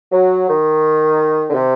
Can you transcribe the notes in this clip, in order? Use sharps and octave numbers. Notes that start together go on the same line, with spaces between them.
F#3
D#3
D3
C3